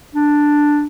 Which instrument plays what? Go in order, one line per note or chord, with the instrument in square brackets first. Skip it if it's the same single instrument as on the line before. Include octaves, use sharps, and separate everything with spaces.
[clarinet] D4